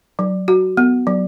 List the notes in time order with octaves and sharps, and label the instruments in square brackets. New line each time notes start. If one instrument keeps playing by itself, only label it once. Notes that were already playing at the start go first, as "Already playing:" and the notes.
[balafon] F#3
F#4
B3
F#3